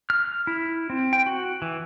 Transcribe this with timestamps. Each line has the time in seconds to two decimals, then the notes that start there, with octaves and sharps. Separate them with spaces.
0.10 F6
0.47 E4
0.90 C4
1.13 G5
1.26 F#4
1.62 E3